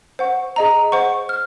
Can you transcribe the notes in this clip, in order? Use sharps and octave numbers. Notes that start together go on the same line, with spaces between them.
C5 F#5 C#6
G#4 D#5 A#5
C5 F#5 C#6
F6